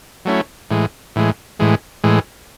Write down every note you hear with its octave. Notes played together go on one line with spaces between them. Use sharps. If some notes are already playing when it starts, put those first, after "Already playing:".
F#3 A3 C#4 E4
A2 E3 G#3
A2 E3 G#3
A2 E3 G#3
A2 E3 G#3